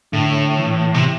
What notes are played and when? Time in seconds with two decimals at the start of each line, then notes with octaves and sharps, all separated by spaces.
0.13 A2 D3
0.59 E3
0.94 C3